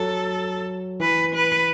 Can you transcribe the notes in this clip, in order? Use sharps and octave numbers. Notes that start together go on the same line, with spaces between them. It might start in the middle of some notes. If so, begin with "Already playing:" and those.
Already playing: F#3 A4
E3 B4
B4